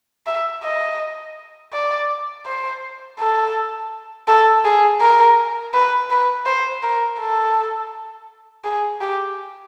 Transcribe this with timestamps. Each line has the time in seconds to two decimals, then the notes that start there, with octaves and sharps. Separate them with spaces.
0.26 E5
0.63 D#5
1.73 D5
2.46 C5
3.19 A4
4.28 A4
4.65 G#4
5.01 A#4
5.74 B4
6.10 B4
6.46 C5
6.83 A#4
7.20 A4
8.64 G#4
9.01 G4